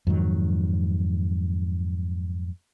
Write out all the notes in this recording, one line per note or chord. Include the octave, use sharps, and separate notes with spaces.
F2 G#2 D#3 F#3